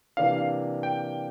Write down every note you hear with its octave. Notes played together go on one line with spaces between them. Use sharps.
C3 E3 A#3 D4 F5
G5